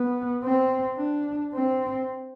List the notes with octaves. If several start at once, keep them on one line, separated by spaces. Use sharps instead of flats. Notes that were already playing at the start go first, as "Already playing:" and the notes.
Already playing: B3
C4
D4
C4